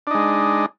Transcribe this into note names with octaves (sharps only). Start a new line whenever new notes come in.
G#3 D4 D#4